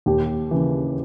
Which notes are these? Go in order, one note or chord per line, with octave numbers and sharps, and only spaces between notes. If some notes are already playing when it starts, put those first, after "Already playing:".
D#2 G4
C#3 E3